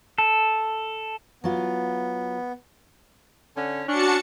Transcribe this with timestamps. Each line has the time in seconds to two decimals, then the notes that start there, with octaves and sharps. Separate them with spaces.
0.18 A4
1.44 F#3 B3 F4
3.56 D3 C#4
3.88 C#4 D4 F#4 A5 C#7